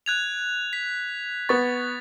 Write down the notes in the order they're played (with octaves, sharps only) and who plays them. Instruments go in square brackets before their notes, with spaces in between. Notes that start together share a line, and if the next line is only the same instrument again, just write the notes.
[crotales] F#6 G#6 F7
B6
[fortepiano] B3 C#6 [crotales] A6